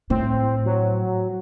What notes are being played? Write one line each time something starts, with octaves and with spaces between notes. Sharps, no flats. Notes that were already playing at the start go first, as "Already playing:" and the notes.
A2 C4
F#3